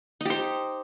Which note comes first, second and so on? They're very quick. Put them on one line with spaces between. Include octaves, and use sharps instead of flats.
D#4 G4 C5